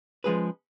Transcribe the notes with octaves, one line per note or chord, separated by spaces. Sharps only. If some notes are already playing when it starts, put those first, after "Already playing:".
F3 G#3 C#4 G#4 B4